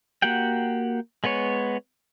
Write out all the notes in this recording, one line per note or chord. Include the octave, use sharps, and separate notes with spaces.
A#3 F#4 G4 F#5 G5
G#3 B3 B4 C#5